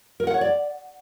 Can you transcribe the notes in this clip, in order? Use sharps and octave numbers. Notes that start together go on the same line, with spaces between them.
A#4
F#5
C#5
D5